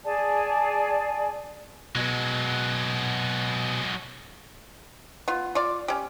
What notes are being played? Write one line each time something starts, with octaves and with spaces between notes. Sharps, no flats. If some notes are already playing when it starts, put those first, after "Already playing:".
G#4 D5 G#5 A5
B2 F#3 G#3
B3 F4
F4 D5
C#4 G4